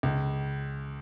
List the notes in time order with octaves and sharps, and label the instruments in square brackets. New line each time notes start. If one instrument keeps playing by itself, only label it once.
[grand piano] C#2